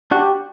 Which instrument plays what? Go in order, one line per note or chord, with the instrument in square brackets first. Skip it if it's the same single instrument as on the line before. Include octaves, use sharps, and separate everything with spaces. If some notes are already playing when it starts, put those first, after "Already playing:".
[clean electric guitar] D4 F#4 [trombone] G4